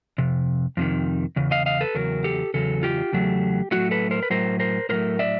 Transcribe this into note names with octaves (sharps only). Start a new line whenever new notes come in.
F2 C3
F2 C3 D#3
E2 C#3
D#5 F5
D#5 F5
A4 B4
E2 C#3 F#3 A#4
G4 A4
E2 C#3 F#3 A4
F4 G4
E2 C#3 F#3 A3
A2 F#3 A3 E4 F#4
A4 B4
A#4 C5
B4
A2 F#3 A3 A#4 C5
A#4 C5
A2 F#3 A3 A#4 C5
D5 E5